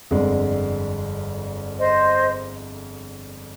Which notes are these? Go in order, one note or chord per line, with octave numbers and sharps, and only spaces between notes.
G1 F2 D3 G#3
C5 D#5